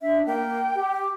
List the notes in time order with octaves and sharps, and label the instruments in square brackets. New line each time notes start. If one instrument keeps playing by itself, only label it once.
[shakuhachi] D4 [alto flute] E5
[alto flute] A#3 [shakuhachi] G5
[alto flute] G4